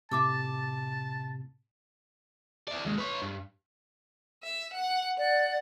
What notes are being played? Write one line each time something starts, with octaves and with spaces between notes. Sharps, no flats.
A2 C3 E5 A5 D6 E6
E4 D5
D#2 G#3
B4 C#5
G2
E5
F#5
D5 F#5